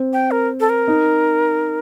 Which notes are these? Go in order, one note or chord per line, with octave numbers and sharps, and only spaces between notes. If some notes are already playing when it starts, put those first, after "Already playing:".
Already playing: C4
G5
A#4
A4
A#4
D#4